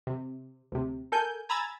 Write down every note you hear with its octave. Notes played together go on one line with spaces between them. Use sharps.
C3
D2 C3
A4 A#4 G#5 G6
G#5 A#5 B5 E6 G#6 A6